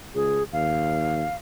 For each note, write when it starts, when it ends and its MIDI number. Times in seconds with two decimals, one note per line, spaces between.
0.15 0.39 37
0.15 0.43 68
0.53 1.25 39
0.53 1.36 77